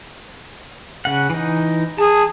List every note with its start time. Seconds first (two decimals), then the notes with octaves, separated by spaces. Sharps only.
1.05 C#3 F#5
1.30 E3 D#4
1.98 G#4 A5